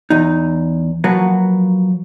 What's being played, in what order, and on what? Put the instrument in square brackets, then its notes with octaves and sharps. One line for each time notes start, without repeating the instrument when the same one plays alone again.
[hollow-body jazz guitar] E2 D#4
F3 F#3 A#3 F#4 B4